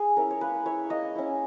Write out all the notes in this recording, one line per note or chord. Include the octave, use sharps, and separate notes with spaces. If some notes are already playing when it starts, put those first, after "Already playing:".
Already playing: G#4
C#4 E4 A#4
C#5
A#3 B4
E4 C#5
A#3 D#5
C#4 E4